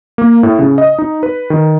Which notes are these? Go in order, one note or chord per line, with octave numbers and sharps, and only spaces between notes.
A#3
A2
C#3
D#5
D#4
B4
D#3